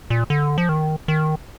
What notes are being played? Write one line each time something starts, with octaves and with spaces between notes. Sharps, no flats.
A#2
D3
F3
D#3
D#3